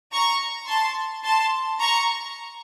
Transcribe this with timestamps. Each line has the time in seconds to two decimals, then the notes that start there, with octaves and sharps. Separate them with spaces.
0.13 A#5 C#6
0.68 A5 C6
1.24 A5 C6
1.81 A#5 C#6